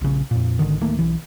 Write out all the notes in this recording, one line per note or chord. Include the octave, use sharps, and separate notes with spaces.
A#1 C#3
F2 A#2
G#1 D#2 D3 D#3
D1 D#3 A3 A#3
B1 E3